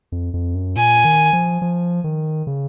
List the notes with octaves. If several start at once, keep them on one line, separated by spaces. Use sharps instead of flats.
F2
F2
F#2
A#2 G#5
D#3
F3
F3
D#3
C#3